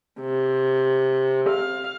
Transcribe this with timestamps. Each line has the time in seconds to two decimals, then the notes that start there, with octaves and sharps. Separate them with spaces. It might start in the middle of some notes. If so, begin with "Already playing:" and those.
0.20 C3
1.50 F5